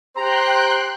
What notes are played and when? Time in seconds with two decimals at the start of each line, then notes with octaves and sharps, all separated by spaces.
0.16 G4 C5 G5 A#5 C6 F#6